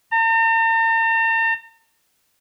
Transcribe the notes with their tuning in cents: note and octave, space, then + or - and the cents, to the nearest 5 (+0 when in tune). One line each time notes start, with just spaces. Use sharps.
A#5 -45